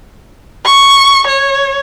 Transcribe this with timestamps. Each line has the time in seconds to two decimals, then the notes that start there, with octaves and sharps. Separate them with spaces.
0.65 C#6
1.27 C#5